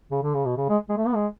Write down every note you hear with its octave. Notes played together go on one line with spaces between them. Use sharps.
C#3
D3
C#3
B2
C#3
G#3
G#3
A3
B3
G#3